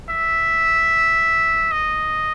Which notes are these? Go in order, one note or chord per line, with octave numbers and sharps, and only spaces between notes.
E5
D#5